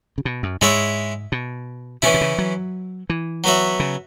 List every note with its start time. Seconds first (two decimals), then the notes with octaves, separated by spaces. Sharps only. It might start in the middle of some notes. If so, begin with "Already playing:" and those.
0.18 C#3
0.25 B2
0.43 F#2
0.61 G#2 G#3 E4 C#5 E5
1.32 B2
2.02 B2 E3 C#4 E4
2.14 B2
2.21 C#3
2.38 F#3
3.10 E3
3.44 F#3 B3 F#4 C#5 E5
3.80 C#3